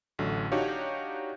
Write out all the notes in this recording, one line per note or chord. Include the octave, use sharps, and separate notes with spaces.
A1 D3 F#3 A3
D4 D#4 F#4 G4 C#5 F5